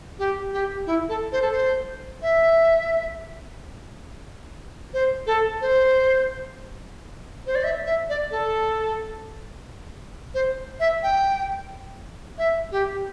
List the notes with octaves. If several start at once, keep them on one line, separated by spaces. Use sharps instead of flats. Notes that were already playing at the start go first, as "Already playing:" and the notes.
G4
G4
E4
A4
C5
A4
C5
E5
C5
A4
C5
C5
D5
E5
E5
D5
A4
C5
E5
G5
E5
G4